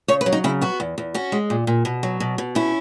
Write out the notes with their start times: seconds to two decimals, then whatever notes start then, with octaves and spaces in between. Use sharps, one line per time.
0.08 C#3 C#5
0.21 B4
0.26 F#3
0.32 D#4
0.44 C#3 E4
0.61 B3 F#4
0.80 E2
0.98 E2
1.14 C#4 F#4
1.32 G#3
1.50 A#2
1.67 A#2
1.85 B2
2.03 F#3
2.20 B2
2.38 B2
2.55 C#4 E4